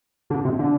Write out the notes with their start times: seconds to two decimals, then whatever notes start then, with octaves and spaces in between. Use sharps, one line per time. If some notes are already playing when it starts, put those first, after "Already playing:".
0.30 D3
0.44 C3
0.59 D3